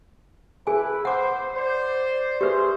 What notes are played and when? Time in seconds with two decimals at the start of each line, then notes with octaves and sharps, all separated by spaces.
0.67 E4 G#4 B4 G#5
1.05 C5 F#5 D6
1.55 C5 D5
2.41 G4 G#4 B4 E5 C6